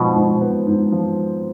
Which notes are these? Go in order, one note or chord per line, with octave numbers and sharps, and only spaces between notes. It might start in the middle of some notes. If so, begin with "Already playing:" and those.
Already playing: G#2 B2 F3 B3
G#2
B3
G#2
F3